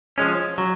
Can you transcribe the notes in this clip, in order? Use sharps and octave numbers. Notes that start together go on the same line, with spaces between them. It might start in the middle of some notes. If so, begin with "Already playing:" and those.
F3 G#3 C#4
F#3